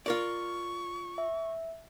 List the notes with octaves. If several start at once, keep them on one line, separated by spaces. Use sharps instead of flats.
F4 A#4 D5 C#6
E5